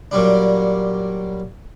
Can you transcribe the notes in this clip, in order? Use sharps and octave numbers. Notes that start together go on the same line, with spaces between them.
A#2 F#3 G3 D4